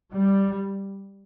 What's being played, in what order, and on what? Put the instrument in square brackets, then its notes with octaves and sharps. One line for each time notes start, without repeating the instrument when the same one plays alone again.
[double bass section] G3